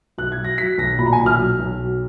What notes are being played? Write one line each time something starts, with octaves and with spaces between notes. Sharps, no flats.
B1 F#6
G#6
F#3
A#6
F#3 B6
B1 A#6
A#2 B5
A#5
G#5
B1
F6
F#3
B1
F#3